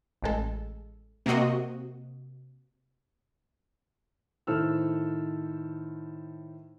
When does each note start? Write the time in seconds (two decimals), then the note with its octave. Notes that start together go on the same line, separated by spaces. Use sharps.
0.23 A1 G#3 A4
1.26 C3 A#3 C4 F#4 D#5
4.47 A2 D#3 A4 C5 E6 F6